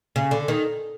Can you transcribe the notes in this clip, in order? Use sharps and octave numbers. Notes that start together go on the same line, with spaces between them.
C#3
D3
D#3